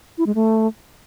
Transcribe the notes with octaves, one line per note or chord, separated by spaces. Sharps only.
E4
G#3
A3